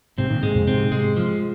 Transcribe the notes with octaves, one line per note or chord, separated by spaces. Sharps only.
G#2 C3 C4
A#2 D#3
G#2 C3 G#3
F2 A#2
G#2 C3 C4
G#2 C3 G#3
F3